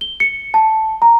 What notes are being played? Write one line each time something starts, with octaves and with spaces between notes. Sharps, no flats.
G7
C#7
A5
A#5